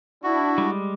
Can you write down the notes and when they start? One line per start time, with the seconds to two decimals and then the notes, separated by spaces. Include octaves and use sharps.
0.24 D4 E4 F#4
0.58 G3 G#3